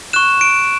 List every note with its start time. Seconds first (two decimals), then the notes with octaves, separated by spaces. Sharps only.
0.13 C#6 F#6 E7
0.41 D7